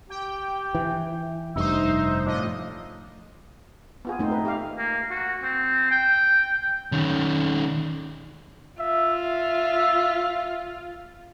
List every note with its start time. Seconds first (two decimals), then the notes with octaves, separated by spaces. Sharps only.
0.10 G4 G5
0.75 E3
1.56 F1 G2 D#4 C5 E5
2.26 A2 F3 D4 D#5
4.05 B3 F4 G#4
4.19 A3 C4 D#4 C5
4.32 B4
4.45 G4 F5
4.78 A#3
5.10 F#4
5.43 C4
5.91 G5
6.92 D#3 C#4
8.80 F4 E5